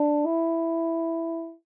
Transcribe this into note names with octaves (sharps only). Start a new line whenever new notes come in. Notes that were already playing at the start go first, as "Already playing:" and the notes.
Already playing: D4
E4